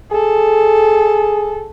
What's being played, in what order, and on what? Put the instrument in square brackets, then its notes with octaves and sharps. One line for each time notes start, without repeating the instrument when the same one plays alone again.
[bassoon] G#4 [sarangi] A4